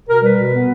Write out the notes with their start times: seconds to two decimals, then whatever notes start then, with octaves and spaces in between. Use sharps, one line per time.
0.08 B2 A#4
0.22 G3 B4
0.38 B2
0.53 B3